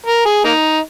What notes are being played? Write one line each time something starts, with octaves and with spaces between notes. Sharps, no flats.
A#4
G#4
A#3 D#4